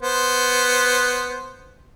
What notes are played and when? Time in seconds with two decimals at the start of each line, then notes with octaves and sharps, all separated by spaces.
0.03 B3 C5